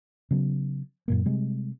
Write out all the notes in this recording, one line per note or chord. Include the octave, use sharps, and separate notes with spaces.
C#3 F#3 B3
F#2 A#2 A#3
C3 G3 G#3